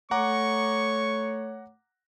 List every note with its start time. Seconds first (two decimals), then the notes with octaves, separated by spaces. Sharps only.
0.11 A3 C#5 F#5 A#5 C#6 D6